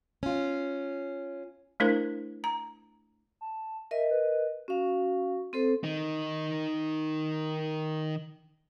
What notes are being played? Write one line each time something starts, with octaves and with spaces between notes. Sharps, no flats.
C#4 F4
A3 D4 E4 A#4 C5
A#5
A5
A#4 D#5 E5
B4
C#4 F#4 F5
C4 A4 C5
D#3 D#4